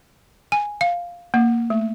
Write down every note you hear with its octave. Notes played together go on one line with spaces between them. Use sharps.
G#5
F5
A#3
A3